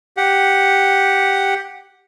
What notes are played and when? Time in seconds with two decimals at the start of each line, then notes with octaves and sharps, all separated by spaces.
0.17 G4 F#5